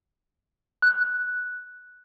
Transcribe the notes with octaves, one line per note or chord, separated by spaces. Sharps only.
F#6